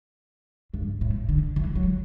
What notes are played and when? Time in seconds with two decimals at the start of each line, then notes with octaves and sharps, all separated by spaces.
0.74 G2
1.01 A2
1.29 D3
1.56 E3
1.76 F#3